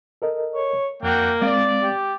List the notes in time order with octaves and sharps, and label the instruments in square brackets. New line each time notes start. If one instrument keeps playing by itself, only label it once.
[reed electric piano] A4 A#4 D#5
[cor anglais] C#5
[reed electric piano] F2 [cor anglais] A#3 [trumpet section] D4 F#4 G5
[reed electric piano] G#3 C4 F5 [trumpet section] D5
[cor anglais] G4